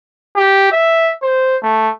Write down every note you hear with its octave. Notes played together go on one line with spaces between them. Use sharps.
G4
E5
C5
A3